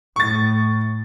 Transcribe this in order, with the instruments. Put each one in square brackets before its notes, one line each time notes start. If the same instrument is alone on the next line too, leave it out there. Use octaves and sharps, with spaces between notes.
[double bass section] A2 [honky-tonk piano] C#6 A6